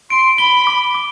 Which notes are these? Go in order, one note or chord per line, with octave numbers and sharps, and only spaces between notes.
C6 D7
B5 G7
D6
D6